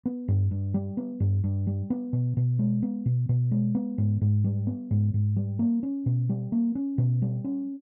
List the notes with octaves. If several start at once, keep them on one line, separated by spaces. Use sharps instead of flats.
B3
G2
G2
G3
B3
G2
G2
G3
B3
B2
B2
G#3
B3
B2
B2
G#3
B3
G#2
G#2
G3
B3
G#2
G#2
G3
A#3
C#4
B2
G3
A#3
C#4
B2
G3
C#4